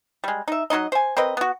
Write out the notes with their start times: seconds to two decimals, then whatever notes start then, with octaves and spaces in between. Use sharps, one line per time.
0.24 G3 G#3
0.48 D#4 E5
0.70 F#3 C#4 D#4 D#5
0.92 C5 G#5
1.17 C4 A#4 B4 D#5
1.37 B3 F#4